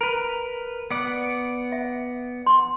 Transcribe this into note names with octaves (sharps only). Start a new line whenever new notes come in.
A#4 B4
B3 D5 F#5
E5
C6